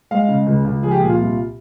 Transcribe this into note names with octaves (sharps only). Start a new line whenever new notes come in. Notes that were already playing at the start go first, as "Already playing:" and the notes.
G#3 F5
C#3
C#2
C#2
F3 G#4
G4
A#2 G#4
F4
C2